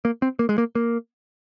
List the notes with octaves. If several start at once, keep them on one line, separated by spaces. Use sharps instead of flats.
A#3
C4
A#3
G#3
A#3
A#3